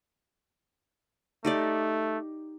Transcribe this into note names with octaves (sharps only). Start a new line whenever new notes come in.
A3 D#4 G4 D5